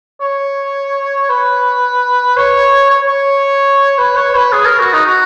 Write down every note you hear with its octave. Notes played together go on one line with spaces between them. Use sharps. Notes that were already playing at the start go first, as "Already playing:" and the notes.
C#5
B4
C#5
C#5
C#5
B4
C#5
B4
G#4
A#4
F#4
D#4
F#4